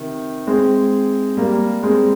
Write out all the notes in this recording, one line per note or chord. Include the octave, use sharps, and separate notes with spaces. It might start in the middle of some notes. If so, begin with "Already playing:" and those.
Already playing: C3 D#3
G#3 C4
G3 A#3
G#3 C4